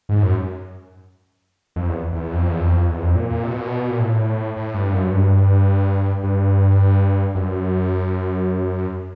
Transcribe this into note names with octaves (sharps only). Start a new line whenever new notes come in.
G#2
F#2
F2
E2
E2
F2
E2
F2
E2
F2
A#2
A#2
C3
B2
A#2
B2
A#2
A2
A2
G2
F#2
G2
G2
F#2